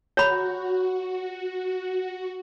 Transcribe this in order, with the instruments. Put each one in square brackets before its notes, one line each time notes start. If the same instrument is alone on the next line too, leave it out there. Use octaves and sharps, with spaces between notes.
[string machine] F#4 [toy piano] C#5 A#5 B5